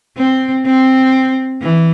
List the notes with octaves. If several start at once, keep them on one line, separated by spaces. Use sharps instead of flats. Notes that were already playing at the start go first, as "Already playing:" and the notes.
C4
C4
E3